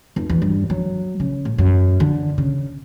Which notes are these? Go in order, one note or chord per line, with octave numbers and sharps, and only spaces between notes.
F1
E2
G2
F#3
C#3
A2
F#2
D3
C#3